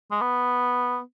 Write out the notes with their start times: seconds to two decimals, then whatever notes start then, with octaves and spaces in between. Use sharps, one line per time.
0.11 G#3
0.21 B3